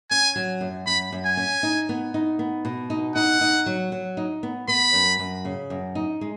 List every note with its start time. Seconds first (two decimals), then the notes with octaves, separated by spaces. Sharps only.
0.10 C#4 G#5
0.36 F#3
0.61 F#2
0.87 F#2 B5
1.12 F#2
1.25 G#5
1.37 C#4
1.63 D#4
1.89 B3
2.14 D#4
2.39 B3
2.65 B2
2.90 D#4
3.15 D#4 F#5
3.41 D#4
3.66 F#3
3.92 F#3
4.17 D#4
4.43 B3
4.68 B3 B5
4.94 F#2
5.19 F#2
5.45 C#3
5.70 F#2
5.95 D#4
6.21 G#3